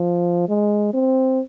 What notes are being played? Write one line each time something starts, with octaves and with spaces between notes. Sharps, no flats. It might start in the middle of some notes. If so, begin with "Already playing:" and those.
Already playing: F3
G#3
C4